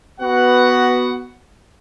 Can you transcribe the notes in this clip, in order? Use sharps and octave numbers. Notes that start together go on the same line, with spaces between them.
B3 F#4 F#5